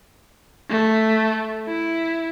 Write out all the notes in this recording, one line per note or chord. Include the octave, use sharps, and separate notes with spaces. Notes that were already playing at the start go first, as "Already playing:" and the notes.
A3
E4